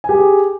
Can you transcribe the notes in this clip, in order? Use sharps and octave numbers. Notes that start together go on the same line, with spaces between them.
G4 G#4 G#5